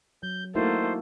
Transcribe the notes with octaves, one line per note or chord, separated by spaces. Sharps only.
F#3 G6
A3 A#3 D#4 E4 F#4 C5